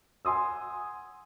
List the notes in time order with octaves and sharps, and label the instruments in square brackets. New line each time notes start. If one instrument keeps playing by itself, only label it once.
[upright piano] F#5 G#5 C6 D#6 E6